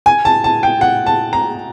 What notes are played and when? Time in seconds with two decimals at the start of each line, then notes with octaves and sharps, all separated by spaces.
0.06 G#5
0.25 A5
0.44 A5
0.63 G5
0.81 F#5
1.06 A5
1.33 A#5